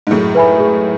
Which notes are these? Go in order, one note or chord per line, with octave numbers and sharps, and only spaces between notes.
G#2
F#2 A2 G#4
B4 E5 G#5 B5
G#4